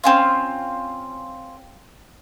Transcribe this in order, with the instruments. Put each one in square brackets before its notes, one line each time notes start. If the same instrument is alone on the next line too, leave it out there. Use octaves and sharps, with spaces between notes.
[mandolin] C4 C#4 F4